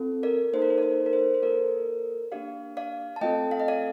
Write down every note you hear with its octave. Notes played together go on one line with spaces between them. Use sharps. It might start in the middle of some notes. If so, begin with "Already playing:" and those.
Already playing: C4 F4 A4
A#4 D5
A#3 D#4 A4 C5
A#4
C5
D5
C5
A#4
C5
C5
A#3 F4 A4 A#4 D5
A#3 D4 G4 D5 F5
D5 F5
A5
A3 C4 F4 A4 D#5 G5
F5
D#5
D5 F5